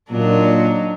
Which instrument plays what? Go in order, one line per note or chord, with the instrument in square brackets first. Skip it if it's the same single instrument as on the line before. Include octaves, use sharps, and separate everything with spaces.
[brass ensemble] A#2 [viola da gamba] F#3 D4 D#4